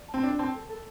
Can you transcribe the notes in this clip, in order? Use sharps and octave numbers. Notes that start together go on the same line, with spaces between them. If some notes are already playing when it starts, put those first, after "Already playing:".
Already playing: D5
A5
C4
D4 A#4
C4 A5
A4
A4